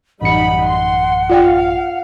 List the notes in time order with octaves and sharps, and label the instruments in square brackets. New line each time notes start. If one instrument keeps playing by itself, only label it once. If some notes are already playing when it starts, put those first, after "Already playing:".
[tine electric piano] A1 F#2 C#7 [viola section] G3 D#4 B5 [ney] F#5
[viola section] C6
[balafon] F4 D5 G5 [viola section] F5